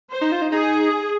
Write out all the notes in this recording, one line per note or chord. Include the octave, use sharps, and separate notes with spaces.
C5
D#4
F4
D#4
D#4 G#4